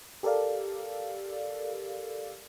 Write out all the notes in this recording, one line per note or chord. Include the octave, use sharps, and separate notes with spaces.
G4 A4 A#4 D5 F5